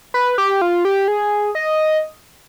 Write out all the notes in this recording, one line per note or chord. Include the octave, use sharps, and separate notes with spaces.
B4
G4
F4
G4
G#4
D#5